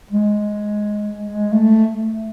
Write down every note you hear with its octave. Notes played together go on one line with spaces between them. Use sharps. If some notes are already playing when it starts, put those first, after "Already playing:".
G#3
A3